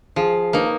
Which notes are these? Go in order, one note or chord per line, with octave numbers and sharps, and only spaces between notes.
F3 G#4
A#3 D#4 B4